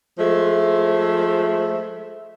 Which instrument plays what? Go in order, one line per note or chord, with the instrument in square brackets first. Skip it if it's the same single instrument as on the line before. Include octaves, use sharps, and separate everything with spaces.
[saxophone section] F3 G#3 A3 C5 E5